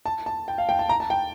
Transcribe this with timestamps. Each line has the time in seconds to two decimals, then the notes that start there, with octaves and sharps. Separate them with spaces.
0.06 A5
0.26 A5
0.48 G5
0.58 F5
0.69 G5
0.79 A5
0.89 A#5
1.00 A5
1.10 G5